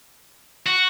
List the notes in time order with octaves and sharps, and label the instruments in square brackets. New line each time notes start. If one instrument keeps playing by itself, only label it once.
[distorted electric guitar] F#4